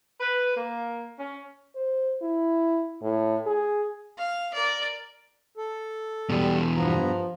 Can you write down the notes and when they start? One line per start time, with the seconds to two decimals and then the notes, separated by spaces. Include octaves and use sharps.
0.20 B4
0.56 A#3
1.18 C#4
1.75 C5
2.22 E4
3.02 A2
3.46 G#4
4.18 F5
4.54 A#4 D5
5.57 A4
6.30 E2 B2 G3
6.77 G2 F3 B3 A#5